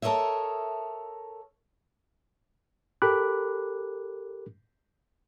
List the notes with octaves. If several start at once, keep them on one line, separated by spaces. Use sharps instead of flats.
A4 A#4 C#5 D#5 E5
G4 A4 A#4 B5 D6 F#6